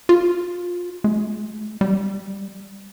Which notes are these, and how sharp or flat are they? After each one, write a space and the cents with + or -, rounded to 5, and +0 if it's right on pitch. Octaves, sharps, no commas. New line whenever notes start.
F4 +20
A3 -45
G3 +15